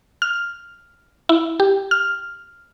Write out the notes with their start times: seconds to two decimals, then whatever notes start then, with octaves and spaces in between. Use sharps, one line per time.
0.22 F6
1.29 E4
1.60 G4
1.91 F6